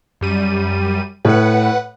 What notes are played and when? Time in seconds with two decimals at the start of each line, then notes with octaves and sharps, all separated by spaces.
0.21 F#2 G3 D#7
1.25 A2 B4 F#5